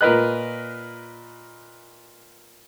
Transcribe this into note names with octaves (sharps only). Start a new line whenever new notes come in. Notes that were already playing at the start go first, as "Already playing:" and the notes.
A#2 A#4 B4 D#5 F#6